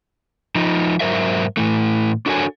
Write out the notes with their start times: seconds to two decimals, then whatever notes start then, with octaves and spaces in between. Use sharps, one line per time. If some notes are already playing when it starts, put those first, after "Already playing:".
0.55 F3 D#4
1.00 G#2 F#3 A#4 C5 E5
1.57 A2 E3 A3
2.26 D4 F#4 A4 A#4 C#5 G#5